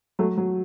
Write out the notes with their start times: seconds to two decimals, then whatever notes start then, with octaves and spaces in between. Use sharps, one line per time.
0.19 F#3 A3
0.37 F#3